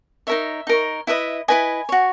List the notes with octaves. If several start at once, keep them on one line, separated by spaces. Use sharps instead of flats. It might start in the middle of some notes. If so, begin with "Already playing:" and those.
D#4 A#4 C#5 E5
D#4 A#4 C#5
E4 B4 D#5 E5
E4 B4 D#5 G#5
F#4 C#5